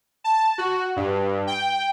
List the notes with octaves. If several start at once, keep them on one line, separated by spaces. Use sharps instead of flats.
A5
F#4
G2
G5